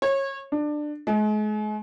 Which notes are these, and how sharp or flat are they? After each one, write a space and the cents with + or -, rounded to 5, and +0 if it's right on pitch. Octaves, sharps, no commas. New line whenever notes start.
C#5 -25
D4 +20
G#3 +40